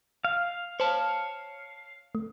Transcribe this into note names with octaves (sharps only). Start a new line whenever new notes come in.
F5
C5 C#5 A5
A3